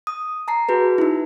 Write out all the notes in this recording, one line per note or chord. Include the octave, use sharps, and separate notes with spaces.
D#6
A5 A#5 C7
F#4 G#4 B4
D#4 E4